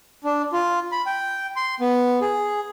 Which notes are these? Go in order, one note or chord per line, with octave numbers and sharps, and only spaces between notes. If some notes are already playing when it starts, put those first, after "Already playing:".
D4
F4
B5
G5
C6
B3
G#4